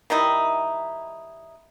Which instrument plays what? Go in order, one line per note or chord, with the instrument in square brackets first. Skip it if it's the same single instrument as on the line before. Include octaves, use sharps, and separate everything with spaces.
[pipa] D#3 G3 D#4 E4